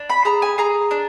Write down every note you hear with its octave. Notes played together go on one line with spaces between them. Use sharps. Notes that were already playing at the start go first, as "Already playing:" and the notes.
Already playing: D4
B5
G#4 A#5
G#5
G#4 A#5
D4